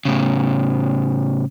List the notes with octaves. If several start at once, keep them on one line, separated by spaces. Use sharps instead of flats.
A2 C#3